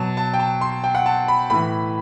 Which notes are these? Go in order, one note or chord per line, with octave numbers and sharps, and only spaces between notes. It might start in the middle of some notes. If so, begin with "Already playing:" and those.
Already playing: B2 F#3 A5
A5
G5
A5
C6
G5
F#5
A5
B5
A2 E3 B5